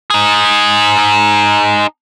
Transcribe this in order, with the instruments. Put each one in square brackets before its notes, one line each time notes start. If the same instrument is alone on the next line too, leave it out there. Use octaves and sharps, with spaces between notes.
[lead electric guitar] D#4 G#4